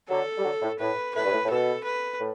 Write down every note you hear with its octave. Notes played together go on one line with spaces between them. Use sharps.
D3 F#3 A4
G3
D3 F#3
A2
A2 B4
A2 B4
G2
A2
A2
B2 A4
B4
A2